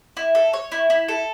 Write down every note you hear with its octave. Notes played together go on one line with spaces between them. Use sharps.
E4
A4
C#5
E4
E4
A4